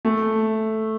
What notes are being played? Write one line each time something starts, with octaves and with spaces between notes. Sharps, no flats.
A3